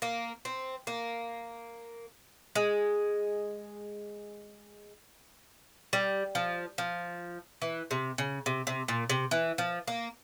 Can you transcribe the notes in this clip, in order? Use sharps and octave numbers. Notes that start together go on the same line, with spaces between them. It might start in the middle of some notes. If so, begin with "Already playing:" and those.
A#3
C4
A#3
G#3
G3
F3
F3
E3
C3
C#3
C3
C3
A#2
C3
E3
F3
A#3